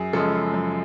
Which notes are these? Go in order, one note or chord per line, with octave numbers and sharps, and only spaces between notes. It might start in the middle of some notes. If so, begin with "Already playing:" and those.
Already playing: F#2 G#4
C#3 F3 G#3 A4
F#2